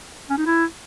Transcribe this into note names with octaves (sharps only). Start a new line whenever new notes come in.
C#4
D#4
E4